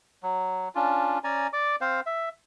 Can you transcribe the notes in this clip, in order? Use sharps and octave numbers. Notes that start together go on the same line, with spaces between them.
F#3
C#4 D4 F4
C#4 D5 G#5 A#5
D5 D6
C4 C5 F5
E5